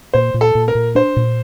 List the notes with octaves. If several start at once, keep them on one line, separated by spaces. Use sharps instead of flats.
A#2 C5
A#2
A4
A#2
A#4
A#2
D4 C5
A#2